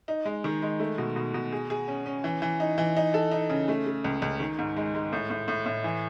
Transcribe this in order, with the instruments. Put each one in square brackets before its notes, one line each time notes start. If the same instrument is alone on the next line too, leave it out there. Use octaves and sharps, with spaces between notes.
[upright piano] D#4
G#3
D#3
G#3
A3
B2
B2
B2
G#4
G#4
C#4
C#4
E3
E3
D#4
E3
D#4
A4
D#4
C#3
A3
A3
C#2
C#2
D#3
G#2
G#3
G#3
A2
A2
A2
A2
E3